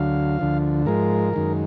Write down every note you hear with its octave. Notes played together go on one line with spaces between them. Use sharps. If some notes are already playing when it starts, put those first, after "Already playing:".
Already playing: D2 D3 F#3 F5
D2 D3 F3
G#2 F3 G#3 A#4
F#2 D#3 G#3